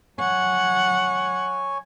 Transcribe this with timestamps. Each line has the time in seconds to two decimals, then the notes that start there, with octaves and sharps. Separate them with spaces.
0.18 F#3 C#5 F#5 G#5